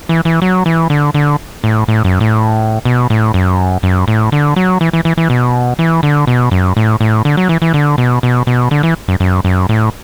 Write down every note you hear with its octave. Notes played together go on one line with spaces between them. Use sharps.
E3
E3
F#3
E3
D3
D3
A2
A2
F#2
A2
B2
A2
F#2
F#2
A2
D3
F#3
E3
E3
E3
E3
B2
E3
D3
B2
F#2
A2
A2
D3
F#3
E3
E3
D3
B2
B2
B2
D3
E3
F#2
F#2
F#2
A2